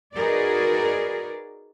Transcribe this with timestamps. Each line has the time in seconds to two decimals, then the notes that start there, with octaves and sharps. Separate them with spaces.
0.14 D#4 F#4 G#4 A#4 B4 D5